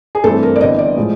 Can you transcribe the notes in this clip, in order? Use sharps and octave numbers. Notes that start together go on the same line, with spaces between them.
G#4
G2 E3 A3 C4 A4
A#4
D5
G1 G2 E3 D#5
D5
A2 F3 G#3